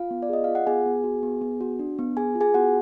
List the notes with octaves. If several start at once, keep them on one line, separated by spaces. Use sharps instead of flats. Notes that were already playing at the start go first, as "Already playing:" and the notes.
Already playing: F4 F5
B3
D5
G#4 D#5
F4 F5
F#5
B3 G#4 G#5
B3
F#4
B3
B3
F#4
D4
B3
G#4 G#5
F4
G#4 G#5
B3 F#4 F#5